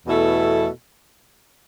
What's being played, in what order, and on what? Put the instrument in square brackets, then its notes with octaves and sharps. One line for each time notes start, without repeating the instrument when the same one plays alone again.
[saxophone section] E2 B2 A3 E4 A4